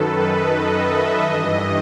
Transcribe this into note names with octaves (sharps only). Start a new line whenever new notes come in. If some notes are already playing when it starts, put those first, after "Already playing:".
Already playing: F#2 D#3 A4 B4
D#5
E5
G2 E3 D#5